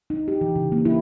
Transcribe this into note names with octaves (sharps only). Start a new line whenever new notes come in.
D#4
G4
E3
C#3
A#3
E4